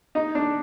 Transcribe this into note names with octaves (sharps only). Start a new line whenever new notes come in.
D#4
D4